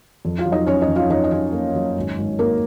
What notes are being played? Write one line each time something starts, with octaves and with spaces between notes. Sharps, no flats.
F2
F4 F5
F#3
D#4 D#5
F#3 C#4 C#5
D#4 D#5
F2
F4 F5
F#3 D#4 D#5
D#5
F#3 C#4 C#5
A#3
F#3
G#1
G#1
G#1 A#3 A#4